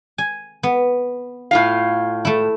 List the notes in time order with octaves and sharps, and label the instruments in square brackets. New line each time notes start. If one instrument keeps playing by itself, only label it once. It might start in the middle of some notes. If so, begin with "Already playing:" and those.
[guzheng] G#5
B3
[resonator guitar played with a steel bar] A2 F4 F5
[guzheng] A3 E4